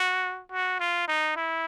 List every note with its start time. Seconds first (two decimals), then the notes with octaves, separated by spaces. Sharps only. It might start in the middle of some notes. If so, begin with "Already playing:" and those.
Already playing: F#4
0.52 F#4
0.80 F4
1.08 D#4
1.37 E4